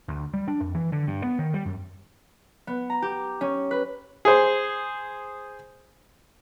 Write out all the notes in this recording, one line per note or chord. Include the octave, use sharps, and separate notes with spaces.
D2
G3
D4
F2
E3
D3
G2
B3
D#3
G3
F#2
B3
A#5
G4
C#4
B4
G#4 C5